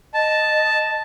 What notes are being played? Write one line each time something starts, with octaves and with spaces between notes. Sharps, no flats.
D#5 A5